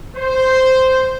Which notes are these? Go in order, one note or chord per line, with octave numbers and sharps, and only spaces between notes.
C5